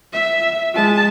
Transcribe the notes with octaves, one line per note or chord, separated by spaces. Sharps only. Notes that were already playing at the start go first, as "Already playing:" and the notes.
E5
G#3 A5